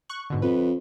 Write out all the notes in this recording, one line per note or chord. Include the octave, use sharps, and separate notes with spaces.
C#6 F#6
G#2 B2 D3
F2 B4